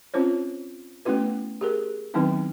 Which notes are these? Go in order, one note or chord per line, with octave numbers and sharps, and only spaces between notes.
C4 C#4 F4 C5 C#5
A3 B3 C#4 E4 F#4 B4
G4 G#4 A#4
D#3 F#3 B3 C4 D#4 E4